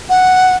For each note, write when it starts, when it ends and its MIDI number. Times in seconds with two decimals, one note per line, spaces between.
0.09 0.56 78